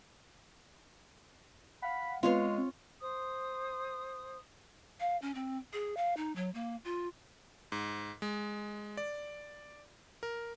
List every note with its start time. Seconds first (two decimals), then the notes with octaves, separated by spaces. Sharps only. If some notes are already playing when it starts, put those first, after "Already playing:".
1.82 F5 F#5 B5
2.23 G#3 B3 C4 F4 B4 C#5 F5
2.58 C4
3.01 C5 D#6
5.00 F5
5.22 C#4
5.35 C4
5.73 G#4
5.97 F5
6.17 D#4
6.36 F#3
6.54 A#3
6.85 F4
7.72 G#2
8.22 G#3
8.97 D5
10.23 A#4